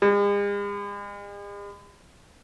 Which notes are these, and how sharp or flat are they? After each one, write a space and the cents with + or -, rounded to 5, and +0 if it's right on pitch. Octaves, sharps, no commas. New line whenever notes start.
G#3 -45